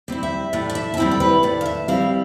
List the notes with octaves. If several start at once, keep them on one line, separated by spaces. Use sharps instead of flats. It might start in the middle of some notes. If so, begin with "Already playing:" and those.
G3 C4 E4
E5
A2 D5
D5
E5
A5
G3 C4 E4 G5
A4
B4
A2 D5
F5
E5
G3 C4 E4 F5